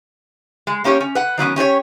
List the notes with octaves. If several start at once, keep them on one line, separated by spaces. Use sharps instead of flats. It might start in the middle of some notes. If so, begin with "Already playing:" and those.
G#3
A#3 C#4 G4 C#5
C#4
B4 F#5
D#3 F#3 B3 C#4
C#4 G4 C5 C#5